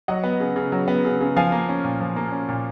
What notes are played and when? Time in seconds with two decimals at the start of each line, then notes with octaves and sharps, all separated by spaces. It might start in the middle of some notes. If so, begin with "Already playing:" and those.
0.08 F#3 D#5 F#5
0.24 B3
0.40 C#3
0.56 C#3
0.72 F#3
0.88 B3
1.05 C#3
1.20 C#3
1.37 F3 F5 G#5
1.52 A#3
1.69 C#4
1.84 A#2
2.00 F3
2.16 A#3
2.32 C#4
2.48 A#2